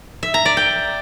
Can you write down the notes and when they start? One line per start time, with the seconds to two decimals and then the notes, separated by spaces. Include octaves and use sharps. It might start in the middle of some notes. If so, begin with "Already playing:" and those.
0.23 E5
0.34 A#5
0.45 D5
0.57 G5